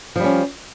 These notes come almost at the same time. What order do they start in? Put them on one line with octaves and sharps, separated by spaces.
F3 G3 C#4